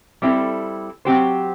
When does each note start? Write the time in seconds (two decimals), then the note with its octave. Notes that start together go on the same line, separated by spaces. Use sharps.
0.22 G3 C4 E4 A4
1.05 F#3 C4 G4 C5